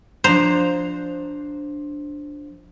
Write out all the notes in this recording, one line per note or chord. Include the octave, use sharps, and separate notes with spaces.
F3 D4 C5 A#5